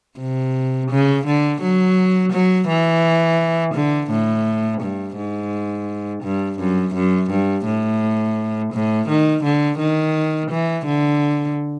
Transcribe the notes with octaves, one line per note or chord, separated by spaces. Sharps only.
C3
C#3
D3
F#3
F#3
E3
D3
A2
G2
G#2
G2
F#2
F#2
G2
A2
A2
D#3
D3
D#3
E3
D3